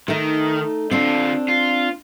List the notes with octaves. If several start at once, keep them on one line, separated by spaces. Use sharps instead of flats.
D#3 A3 D#4
D3 C4 D4 F4
F4